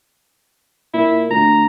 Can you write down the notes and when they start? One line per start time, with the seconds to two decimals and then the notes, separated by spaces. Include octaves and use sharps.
0.94 A#2 E4
1.30 D2 A#5